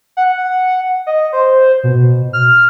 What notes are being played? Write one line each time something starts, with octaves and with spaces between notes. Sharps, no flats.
F#5
D#5
C5
B2
F6